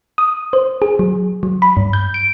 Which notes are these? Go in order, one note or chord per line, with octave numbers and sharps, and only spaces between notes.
D#6
C5
G#4
F#3
F#3
B5
G2
G6
D7